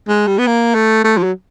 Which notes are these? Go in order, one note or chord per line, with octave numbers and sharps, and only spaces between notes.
G#3
G3
B3
A#3
A3
A3
F3
F#3